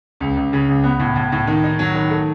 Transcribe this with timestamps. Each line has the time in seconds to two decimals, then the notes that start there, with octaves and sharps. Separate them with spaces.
0.20 C#2
0.37 C#2
0.53 C#3
0.68 C#2
0.84 B3
1.00 A2
1.16 A2
1.32 A2
1.48 D#3
1.64 D#4
1.79 F#3
1.95 D#3
2.10 A3